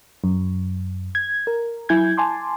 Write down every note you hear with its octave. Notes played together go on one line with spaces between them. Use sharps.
F#2
G#6
A#4
F#3 E4 G#5 G6 G#6
G#5 A5 C6 D6